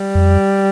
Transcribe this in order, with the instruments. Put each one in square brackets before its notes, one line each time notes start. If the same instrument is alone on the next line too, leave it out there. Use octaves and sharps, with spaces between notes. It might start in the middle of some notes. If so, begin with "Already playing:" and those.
Already playing: [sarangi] G3
[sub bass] F2